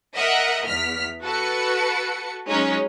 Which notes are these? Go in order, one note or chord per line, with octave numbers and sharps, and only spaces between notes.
A#4 D#5 E5 F#5
E2 F6 B6
F#4 A4 B4 C#7
F#3 G#3 C#4 D#4